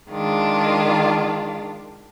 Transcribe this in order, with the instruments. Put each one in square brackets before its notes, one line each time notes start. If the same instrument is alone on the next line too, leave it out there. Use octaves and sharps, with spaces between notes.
[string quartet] D#3 G#3 D4 F4